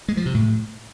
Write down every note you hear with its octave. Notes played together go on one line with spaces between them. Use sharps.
G#3
F3
C3
A2